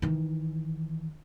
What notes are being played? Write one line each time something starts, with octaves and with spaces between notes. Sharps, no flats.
D#3 E3